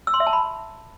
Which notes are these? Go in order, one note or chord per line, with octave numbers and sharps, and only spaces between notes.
E6
C6
E5
A5
B5